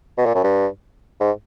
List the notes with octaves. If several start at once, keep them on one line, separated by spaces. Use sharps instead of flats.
B2
A#2
F#2
G2
G#2